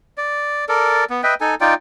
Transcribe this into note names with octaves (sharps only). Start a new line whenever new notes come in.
D5
A4 A#4 D5
B3
B4 D#5 E5 G5
D#4 A4 G#5
D#4 F4 D5 G5